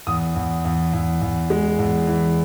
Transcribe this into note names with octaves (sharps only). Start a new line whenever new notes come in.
E2 D#6
E2
E2
E2
E2
G#3
E2
E3